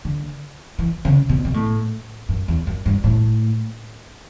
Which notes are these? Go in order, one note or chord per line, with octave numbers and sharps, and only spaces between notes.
D3
E3
C#3
B2
B2
A2
F#2
E2
F#2
G2
A2